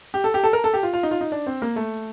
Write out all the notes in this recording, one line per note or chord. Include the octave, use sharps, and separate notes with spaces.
G4
A4
G4
A4
A#4
A4
G4
F4
F4
D#4
F4
D#4
D4
C4
A#3
A3